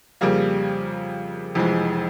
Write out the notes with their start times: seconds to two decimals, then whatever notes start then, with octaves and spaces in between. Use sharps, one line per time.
0.21 F2 C#3 G3 A#3
1.55 F1 F2 E3 G#3